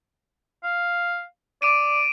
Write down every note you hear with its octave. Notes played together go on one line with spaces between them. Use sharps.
F5
D5 D6 D7 D#7